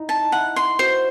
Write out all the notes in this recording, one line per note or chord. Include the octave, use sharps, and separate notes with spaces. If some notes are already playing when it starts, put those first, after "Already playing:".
Already playing: D#4 E4
A5
D#4
E4 F#5
C6
F#4 C5